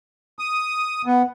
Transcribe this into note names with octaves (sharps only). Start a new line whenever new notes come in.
D#6
B3